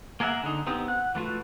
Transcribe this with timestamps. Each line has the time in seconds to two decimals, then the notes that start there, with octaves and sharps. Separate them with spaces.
0.20 A#3 G#4 A#4 E5 F#5
0.43 D3 D#4
0.67 B3 C4 D#4 G4
0.88 F#5 F#6
1.15 E3 A3 F4 F#4